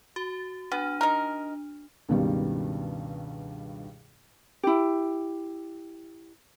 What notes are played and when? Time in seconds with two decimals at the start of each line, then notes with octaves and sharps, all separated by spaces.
0.16 F#4
0.72 B3 D4
1.01 D#4 A#4
2.09 C#2 G2 B2 D#3 G3
4.63 E4 G4